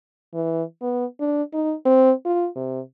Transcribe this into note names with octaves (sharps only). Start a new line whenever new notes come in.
E3
B3
D4
D#4
C4
F4
C3